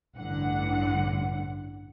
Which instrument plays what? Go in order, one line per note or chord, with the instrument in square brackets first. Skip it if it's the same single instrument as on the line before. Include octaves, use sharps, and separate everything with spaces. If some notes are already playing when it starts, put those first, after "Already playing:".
[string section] A1 G2 D3 F#5